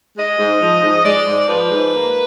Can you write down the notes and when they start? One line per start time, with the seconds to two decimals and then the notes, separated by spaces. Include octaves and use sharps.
0.16 G#3 D#5
0.38 G#2
0.61 F3
0.83 G#2
1.05 G#3 D5
1.27 G#2
1.48 F3 B4
1.71 G#2
1.93 A#3